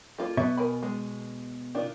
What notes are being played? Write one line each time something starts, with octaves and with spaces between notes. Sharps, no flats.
A#3 F4 A4
B2 F#3 B3 E5
A#4 G#5 B5
G#3
D#3 D4 F4